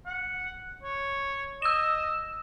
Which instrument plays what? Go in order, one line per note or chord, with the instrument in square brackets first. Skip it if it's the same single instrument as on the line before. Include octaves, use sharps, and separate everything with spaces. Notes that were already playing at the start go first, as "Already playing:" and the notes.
[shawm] F#5
C#5
[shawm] D#5 [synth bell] E6 E7